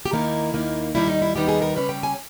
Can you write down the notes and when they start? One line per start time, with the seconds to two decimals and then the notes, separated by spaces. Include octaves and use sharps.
0.06 G4
0.12 D#2 D#3 A#3 D#4 E4
0.53 D#2 D#3 A#3 D#4
0.95 D#2 D#3 G3 B3 D#4 E4
1.08 D#4
1.22 E4
1.35 D#2 D#3 G3 B3 D#4 G4
1.48 G#4
1.62 A#4
1.76 C#3 G3 C#4 B4
1.89 G5
2.03 G#5